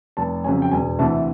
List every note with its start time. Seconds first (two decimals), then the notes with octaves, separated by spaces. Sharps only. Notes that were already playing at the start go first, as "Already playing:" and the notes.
0.17 F1 A5
0.44 F2 C#3 F#3 G#5
0.62 G5
0.71 E1 G#5
0.99 D2 C3 E3 A5